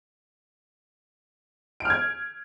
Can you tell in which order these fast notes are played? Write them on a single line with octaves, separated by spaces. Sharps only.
D7 F6 G#6